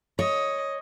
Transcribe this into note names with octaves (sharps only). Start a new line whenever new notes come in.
C#5 D#5